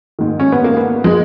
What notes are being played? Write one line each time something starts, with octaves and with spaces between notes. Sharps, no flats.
G#2 D#3
C#4
B3
A#3
B3
G#3